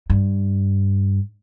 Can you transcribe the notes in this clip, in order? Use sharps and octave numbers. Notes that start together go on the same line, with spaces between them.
G2